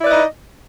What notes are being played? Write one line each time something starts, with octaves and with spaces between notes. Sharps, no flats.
D#4 E4 B4 D5 D#5